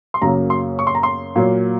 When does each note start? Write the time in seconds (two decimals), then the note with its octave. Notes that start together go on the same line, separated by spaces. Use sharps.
0.14 C6
0.22 F#2 C#3 F#3 A#3 A#5
0.50 C6
0.79 C#6
0.87 C6
0.95 A#5
1.03 C6
1.36 A#2 F#3 A#3